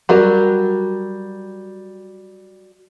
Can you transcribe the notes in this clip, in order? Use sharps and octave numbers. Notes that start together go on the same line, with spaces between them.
F#3 G3 F#4 A#4